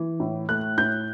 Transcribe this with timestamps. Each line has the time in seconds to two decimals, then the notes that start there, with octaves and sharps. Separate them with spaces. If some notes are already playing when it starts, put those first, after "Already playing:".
Already playing: E3
0.20 A2
0.49 A3 F#6
0.78 A2 G6